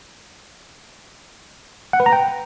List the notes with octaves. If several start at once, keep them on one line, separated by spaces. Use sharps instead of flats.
F#5
B4
A#5
G5